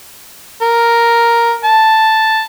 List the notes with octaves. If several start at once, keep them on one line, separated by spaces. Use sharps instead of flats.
A#4
A5